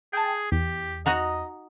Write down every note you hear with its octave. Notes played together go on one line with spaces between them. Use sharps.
G#4 G5 A5
E2 G4
D#4 F#4 D#5 A#5